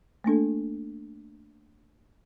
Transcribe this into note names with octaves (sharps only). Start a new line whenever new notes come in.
A3 A#3 D4 A4